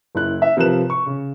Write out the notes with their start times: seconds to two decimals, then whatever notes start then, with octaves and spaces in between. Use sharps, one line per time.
0.15 F#1 E4 F#6
0.42 E5
0.57 C3 F3 A#4 B4 F#6 E7
0.90 C#6
1.06 C#3